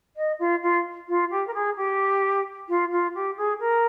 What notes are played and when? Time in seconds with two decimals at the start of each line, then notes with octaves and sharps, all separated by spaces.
0.16 D#5
0.39 F4
0.62 F4
1.08 F4
1.30 G4
1.47 A#4
1.54 G#4
1.76 G4
2.68 F4
2.91 F4
3.14 G4
3.37 G#4
3.59 A#4